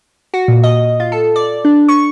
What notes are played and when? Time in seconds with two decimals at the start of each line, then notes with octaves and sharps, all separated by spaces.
0.34 F#4
0.48 A#2
0.64 D#5
1.00 F4
1.12 A4
1.36 D5
1.65 D4
1.88 C#6